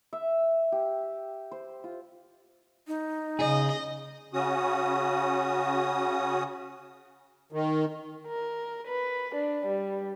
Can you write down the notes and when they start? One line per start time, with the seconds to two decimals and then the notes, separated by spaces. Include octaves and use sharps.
0.13 E5
0.72 G4
1.51 C5
1.84 F4
2.87 D#4
3.39 C#3 G#4 D#5
4.33 C#3 C#4 F#4 D#6
7.52 D#3
8.27 A#4
8.87 B4
9.35 D4
9.66 G3